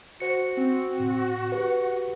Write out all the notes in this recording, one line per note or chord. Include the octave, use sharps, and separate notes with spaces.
F#4 C5 C#7
C4
A2
G4 B4 F#5